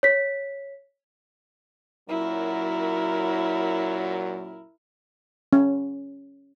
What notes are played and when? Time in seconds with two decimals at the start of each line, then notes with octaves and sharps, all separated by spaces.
0.03 C#5 B6
2.09 F#2 A#2 F#3 E4 A#4
5.53 C#4